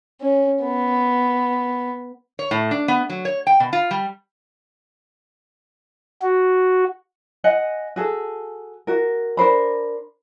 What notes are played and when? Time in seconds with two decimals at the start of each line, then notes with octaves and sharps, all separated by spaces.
0.21 C#4
0.64 B3
2.39 C#5
2.51 A2
2.71 D4
2.88 B3
3.10 F#3
3.25 C#5
3.47 G5
3.60 B2
3.73 F4
3.91 G3
6.22 F#4
7.44 D#5 F#5 G#5
7.96 F#4 G#4 A4
8.87 F#4 A#4
9.37 D4 A#4 C5 B5